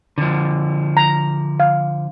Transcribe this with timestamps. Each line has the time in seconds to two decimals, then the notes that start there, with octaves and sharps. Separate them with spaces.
0.18 D3 F3
0.97 A#5
1.60 F5